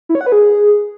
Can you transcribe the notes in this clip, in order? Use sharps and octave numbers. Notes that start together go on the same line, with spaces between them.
E4
C#5
F#5
B4
G#4